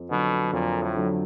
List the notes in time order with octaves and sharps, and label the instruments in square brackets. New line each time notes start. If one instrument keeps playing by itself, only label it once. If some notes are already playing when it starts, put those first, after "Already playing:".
Already playing: [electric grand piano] F2
[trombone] B2 [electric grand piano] D3 F#3
[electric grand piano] F2 [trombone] A#2
[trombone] A2
[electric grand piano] D3 F#3